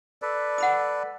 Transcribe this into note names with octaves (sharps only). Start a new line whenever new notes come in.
A4 B4 D5
F#5 B5 D#6